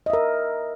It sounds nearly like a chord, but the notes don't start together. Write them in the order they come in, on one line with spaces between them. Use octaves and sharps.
D#5 E5 A#4